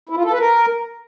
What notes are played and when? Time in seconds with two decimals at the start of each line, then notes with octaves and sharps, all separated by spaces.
0.09 E4
0.17 F4
0.25 A4
0.32 B4
0.40 A#4